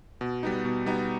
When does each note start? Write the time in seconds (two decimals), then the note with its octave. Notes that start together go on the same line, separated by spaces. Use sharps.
0.21 B2
0.43 G3 B3 D#4
0.65 B2
0.86 G3 B3 D#4